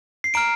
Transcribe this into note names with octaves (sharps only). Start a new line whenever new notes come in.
C7
A#5 F6 D7